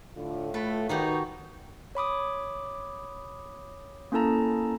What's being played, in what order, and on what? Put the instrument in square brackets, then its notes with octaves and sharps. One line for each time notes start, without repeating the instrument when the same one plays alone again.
[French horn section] A2 F4 [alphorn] D3
[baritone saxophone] A3 [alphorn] A4 [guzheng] B4
[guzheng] D#3 F#4 G4 [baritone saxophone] D#4 [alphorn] B4
[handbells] C#5 B5 D6 D#6
A#3 C#4 E4 A4 A5 A#5